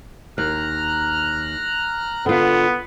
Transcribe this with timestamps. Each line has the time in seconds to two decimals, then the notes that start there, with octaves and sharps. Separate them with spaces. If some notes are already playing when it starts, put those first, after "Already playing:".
0.38 D#2 A#5 F6 F#6
2.26 D3 B3 F4